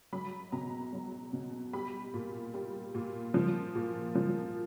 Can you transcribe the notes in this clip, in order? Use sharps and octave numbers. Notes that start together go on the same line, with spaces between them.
F#3 B5
B2 A#5
F#3
B2
G3 B5
A#2
G3
A#2
F3
A#2
F3